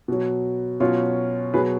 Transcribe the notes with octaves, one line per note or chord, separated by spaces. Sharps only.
B2 F#3
B2 F#3 C#4 F4
B2 F#3 G#4 B4